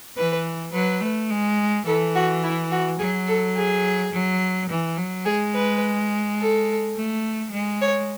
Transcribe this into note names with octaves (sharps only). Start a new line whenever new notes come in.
E3 B4
F#3 B4
A3
G#3
E3 A4
F#4
E4
F#4
F#3 G#4
A4
G#4
F#3
E3
F#3
G#3 G#4
B4
A4
A3
G#3
C#5